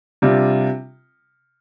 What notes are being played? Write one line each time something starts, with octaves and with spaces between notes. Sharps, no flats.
C3 G3 D4 F4